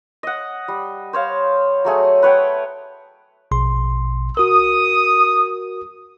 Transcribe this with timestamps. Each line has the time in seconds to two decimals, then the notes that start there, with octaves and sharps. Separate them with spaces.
0.23 D#5 F#5
0.68 G3
1.13 C5 C#5 F5
1.85 F#3 A3 G#4
2.22 B4 C#5 F#5 G5
3.51 A#1 B2 C6
4.37 F#4 A#4 D#6